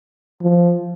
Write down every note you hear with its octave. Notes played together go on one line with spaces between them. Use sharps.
F3